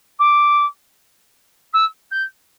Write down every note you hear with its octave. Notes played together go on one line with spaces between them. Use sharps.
D6
E6
G6